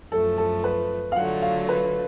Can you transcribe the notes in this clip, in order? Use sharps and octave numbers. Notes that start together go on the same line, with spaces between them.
F#2 F3 A3 A4
A4
B4
F5
D3 F#3 A3 F4 F#5
F5
B4